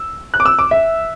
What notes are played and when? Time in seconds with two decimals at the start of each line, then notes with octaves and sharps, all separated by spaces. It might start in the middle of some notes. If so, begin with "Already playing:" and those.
Already playing: E6
0.34 F#6
0.40 D6
0.46 E6
0.59 D6
0.71 E5